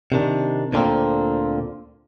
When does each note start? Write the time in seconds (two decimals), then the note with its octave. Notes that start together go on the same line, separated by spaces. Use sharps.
0.12 C3 D#3 D4
0.73 D2 A#2 D3 G3 A#3 C4